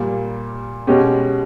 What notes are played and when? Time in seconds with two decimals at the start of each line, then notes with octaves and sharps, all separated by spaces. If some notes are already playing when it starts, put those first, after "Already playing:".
Already playing: A#2 G3 A#3
0.87 B2 G#3 C#4 G4